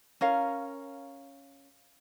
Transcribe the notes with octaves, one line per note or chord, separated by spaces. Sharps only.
C#4 A#4 F5